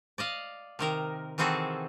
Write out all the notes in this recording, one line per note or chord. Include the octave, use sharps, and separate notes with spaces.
D5 D#5 F5
C3 D#3 A#4
D#3 E3 C4 F#4 G#4 A4